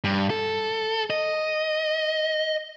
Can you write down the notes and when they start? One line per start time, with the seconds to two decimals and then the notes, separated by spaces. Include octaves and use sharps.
0.04 G2
0.30 A4
1.10 D#5